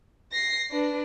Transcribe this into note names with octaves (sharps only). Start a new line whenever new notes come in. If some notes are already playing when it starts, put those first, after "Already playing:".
A#6 C7
D4 B4